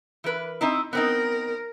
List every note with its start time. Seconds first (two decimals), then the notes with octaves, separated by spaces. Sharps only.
0.24 E3 A#4 B4
0.61 C4 D#4 E4
0.93 B3 C4 D#4 A#4